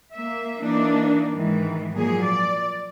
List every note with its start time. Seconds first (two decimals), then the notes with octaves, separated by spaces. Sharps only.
0.14 A#3 E5
0.60 E3 A#3 D4 D#4
1.34 G#2 D#3 E3
1.94 A#2 F3 F#3 G#4
2.25 D5